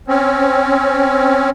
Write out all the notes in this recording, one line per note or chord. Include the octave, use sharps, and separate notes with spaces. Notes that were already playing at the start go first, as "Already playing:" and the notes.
C4 C#4